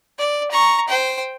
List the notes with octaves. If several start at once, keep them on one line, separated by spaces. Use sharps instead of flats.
D5
A#5 C#6
C5 G5